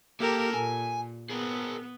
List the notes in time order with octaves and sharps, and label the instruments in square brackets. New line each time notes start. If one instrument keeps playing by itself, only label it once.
[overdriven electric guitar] A#3 [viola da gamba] G4 A4 A#4
[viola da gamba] A#2 [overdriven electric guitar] G#5
[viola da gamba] B3 [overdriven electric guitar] G#4 A#4